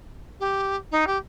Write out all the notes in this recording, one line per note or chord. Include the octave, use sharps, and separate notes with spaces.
G4
D#4
G4